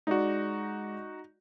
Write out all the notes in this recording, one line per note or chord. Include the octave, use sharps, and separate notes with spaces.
G#3 D#4 F#4 D5 D#5